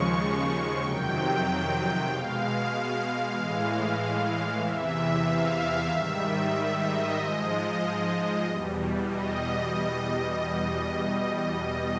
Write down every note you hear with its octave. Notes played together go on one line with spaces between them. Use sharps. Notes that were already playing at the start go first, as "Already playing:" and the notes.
Already playing: D#2 C#3 F3 G#3 C#6
F2 C3 D#3 F#3 G5
B2 G#3 F5
A2 E3 G#3
E2 C3 E3 E5
F5
G#2 D#3 G3 E5
E5
E5
D#5
G#2 F3 G#3
E2 B2 G3
D#5